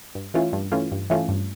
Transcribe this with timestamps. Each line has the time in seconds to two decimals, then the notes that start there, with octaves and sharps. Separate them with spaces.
0.15 G2
0.34 E3 A3 C#4 F4
0.53 G2
0.72 E3 A3 C#4 F4
0.92 G2
1.10 E3 A3 C#4 F4
1.29 G2